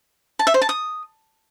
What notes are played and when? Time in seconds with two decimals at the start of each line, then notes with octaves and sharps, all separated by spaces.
0.39 A5
0.47 E5
0.54 C5
0.62 A5
0.69 D#6